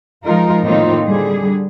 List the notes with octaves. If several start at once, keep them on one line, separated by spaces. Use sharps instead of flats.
F3 G#3 D#4 F4 A#4
A2 D#3 A#3 C4 D#4 F4
D3 G3 G#4